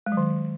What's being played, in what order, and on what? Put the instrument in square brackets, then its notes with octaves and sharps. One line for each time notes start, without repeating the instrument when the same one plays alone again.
[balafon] G#3
F#3
D#3